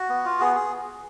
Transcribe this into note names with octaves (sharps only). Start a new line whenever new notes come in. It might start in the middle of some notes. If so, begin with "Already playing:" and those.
Already playing: F#4
B3
F4
B3 G#4
G#4